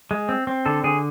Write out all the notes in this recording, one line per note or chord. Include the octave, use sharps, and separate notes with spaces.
G#3
C4
C4
D3 A4
D3 G#4